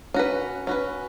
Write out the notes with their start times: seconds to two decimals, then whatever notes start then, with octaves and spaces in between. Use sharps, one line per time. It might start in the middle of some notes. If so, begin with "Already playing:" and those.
0.14 C#4 F#4 B4
0.67 C#4 F#4 B4